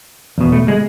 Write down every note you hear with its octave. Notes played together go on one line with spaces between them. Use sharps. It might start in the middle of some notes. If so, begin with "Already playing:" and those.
E2 B2
A3
G#3